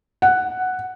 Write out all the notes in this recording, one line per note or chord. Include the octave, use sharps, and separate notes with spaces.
F#5